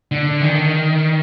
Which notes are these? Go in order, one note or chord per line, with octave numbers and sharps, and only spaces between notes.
D3
D#3